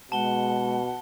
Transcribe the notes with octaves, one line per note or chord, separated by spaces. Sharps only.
B2 G#3 F#5 A5 G7